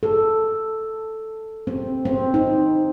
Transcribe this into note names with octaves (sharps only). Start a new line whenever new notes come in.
A4
C4
C4
D#4